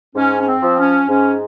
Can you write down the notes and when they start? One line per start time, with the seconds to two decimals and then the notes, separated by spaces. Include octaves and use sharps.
0.15 G#2 C#4
0.39 C#4
0.47 C4
0.62 F3
0.79 C#4
1.09 G#2 C#4